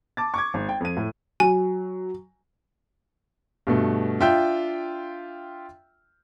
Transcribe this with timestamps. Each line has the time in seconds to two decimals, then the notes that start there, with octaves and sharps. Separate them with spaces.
0.17 A5 D6 A6
0.34 C#6 D6 G#6
0.54 G#1
0.69 G5
0.80 F2 D#7
0.97 A2
1.40 F#3 G#5
3.67 G2 B2 A3
4.20 D4 F4 E5 G5 G6